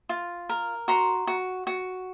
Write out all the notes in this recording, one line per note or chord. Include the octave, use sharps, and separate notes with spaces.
F4
A#4
F#4 A#5 C6
F#4
F#4